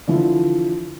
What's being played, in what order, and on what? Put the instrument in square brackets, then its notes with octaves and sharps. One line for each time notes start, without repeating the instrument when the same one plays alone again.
[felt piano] D3 E3 F3 E4